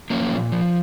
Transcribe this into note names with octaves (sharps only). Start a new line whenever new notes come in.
F3 A#3 C#4
A#2
F3